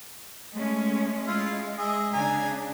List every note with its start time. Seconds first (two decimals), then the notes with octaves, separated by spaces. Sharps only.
0.57 G#3 A3 C#4
1.27 G#3 E4 F4
1.79 G#4 D#5 E5
2.13 C#3 D4 G#5 A#5